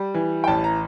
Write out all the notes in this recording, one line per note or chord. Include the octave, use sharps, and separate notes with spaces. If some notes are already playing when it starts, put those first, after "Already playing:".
Already playing: G3
E3
G5
A1 A5
A#5